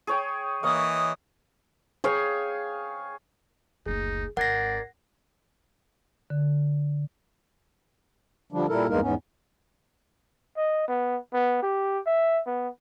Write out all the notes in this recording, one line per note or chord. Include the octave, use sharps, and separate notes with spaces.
G#4 C#5 G5
E3 A#3 C#5 D#5 D#6
G#4 C#5 F5 G5
F#1 D2 D#4 G#4
G#1 A#4 D5 F#5 G#6 A#6 C7
D3
D3 F3 G3 D4
A#2 G3 E4 A4 A#4
E2 G2 G#3 A#3 D#4 A#4
E2 G#2 B3 C#4
D#5
B3
B3
G4
E5
B3